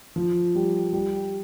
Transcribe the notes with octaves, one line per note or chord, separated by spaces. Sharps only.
F3
G3
G3